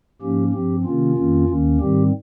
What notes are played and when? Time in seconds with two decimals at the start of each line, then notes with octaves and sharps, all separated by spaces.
0.21 G#2 F3 A#3 C#4 G4
0.53 G2 F3 C4 G4
0.85 C3 D#3 A#3 C#4 F4
1.16 F2 D#3 A#3 C#4
1.49 D#2 D#3 A#3 C#4
1.80 G#2 D#3 G3 C4 G4